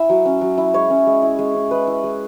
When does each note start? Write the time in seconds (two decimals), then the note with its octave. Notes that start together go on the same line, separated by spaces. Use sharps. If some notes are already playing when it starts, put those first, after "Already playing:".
Already playing: E4 E5 G#5
0.09 F#3
0.25 C#4
0.41 F#3
0.58 E4
0.74 G#3 C#5
0.90 C#4
1.07 G#3
1.22 E4
1.39 G#3
1.55 C#4
1.71 G#3 B4
1.87 E4
2.04 G#3